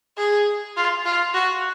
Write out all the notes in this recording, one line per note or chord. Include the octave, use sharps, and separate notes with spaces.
G#4
F4
F4
F#4